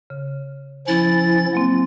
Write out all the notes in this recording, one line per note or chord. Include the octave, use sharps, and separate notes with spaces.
C#3
F3 C#4 E4 A6
F#3 A#3 C4